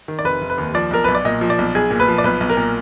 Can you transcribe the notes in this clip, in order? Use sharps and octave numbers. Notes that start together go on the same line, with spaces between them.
D#3
D5
F1 B4
F1
B4
D#2
F3 D5
B1 A#4
B1 B4
D5
A#2 D#5
F3
D5
B1
B1 G#4
A#2
B4
F3
D5
B1 B4
B1
A#4
A#2